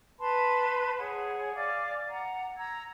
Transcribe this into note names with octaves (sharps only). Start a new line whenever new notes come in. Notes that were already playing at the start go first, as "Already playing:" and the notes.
B4 A5 B5 C6
G#4 C#5 F#5
D5 F5 G#5 D6
F#5 A#5
A#5 E6 G#6